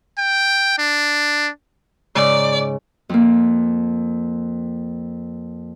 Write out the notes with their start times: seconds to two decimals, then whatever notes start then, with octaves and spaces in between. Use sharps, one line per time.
0.18 G5
0.78 D4
2.15 G#2 C#3 D5
3.09 F2 A#3